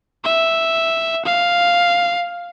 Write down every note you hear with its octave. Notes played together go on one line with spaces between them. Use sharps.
E5
F5